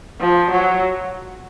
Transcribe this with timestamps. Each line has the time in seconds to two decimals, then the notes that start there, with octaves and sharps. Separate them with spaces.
0.21 F3
0.51 F#3